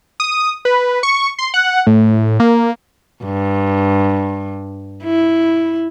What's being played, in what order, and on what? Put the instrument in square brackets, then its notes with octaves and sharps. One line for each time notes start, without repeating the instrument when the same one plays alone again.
[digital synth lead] D#6
B4
C#6
C6
F#5
A2
A#3
[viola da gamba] G2
E4